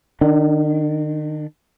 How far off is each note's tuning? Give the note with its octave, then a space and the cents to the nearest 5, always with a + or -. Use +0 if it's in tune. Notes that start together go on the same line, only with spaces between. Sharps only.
D#3 -30 D4 +0